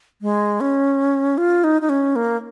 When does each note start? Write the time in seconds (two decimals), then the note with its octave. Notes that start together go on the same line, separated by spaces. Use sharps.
0.22 G#3
0.61 C#4
1.38 F4
1.64 D#4
1.82 D#4
1.89 C#4
2.16 A#3